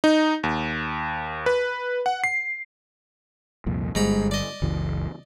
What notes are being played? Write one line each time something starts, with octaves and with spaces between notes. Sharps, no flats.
D#4
D#2
B4
F#5
C7
C2 F2 A#2
G1 G#2 G3 A#5 B5
D5 D#5
F#1 C#2 E3